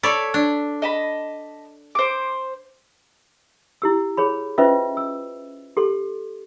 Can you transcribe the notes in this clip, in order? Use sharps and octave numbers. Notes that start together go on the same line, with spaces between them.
A4 C#5 D5 B5
D4
D#5 A5 B5
C5 D6
E4 G4 E6
G#4 C#5 B5
C#4 F4 B4 C5 D#5 E5
E6
G4 A4 C6